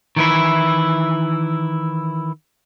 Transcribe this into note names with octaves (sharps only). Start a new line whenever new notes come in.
D#3 E3 E4